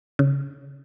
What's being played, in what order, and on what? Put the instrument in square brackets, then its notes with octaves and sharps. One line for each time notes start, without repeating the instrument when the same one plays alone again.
[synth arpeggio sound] C#3